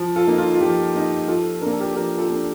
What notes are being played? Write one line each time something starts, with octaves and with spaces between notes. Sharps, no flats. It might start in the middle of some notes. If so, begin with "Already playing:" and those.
Already playing: F3
F4 A4
A#3 D#4
F4
F4
F3 G4
A#3 D#4
F3 F4 A4
A#3 D4 A#4
A4
G4 A#4
F3 G4 A#4
F4 A4
A#3 D4